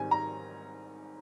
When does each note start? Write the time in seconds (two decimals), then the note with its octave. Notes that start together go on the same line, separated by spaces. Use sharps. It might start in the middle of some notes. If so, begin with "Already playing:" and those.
Already playing: G#2 D#3 G3 C4 G#5
0.11 A#5